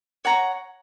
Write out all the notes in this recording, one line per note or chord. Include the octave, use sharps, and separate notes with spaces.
C#5 F#5 A#5